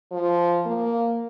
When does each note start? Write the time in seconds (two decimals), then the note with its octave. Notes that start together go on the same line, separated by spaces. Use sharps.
0.11 F3
0.66 A#3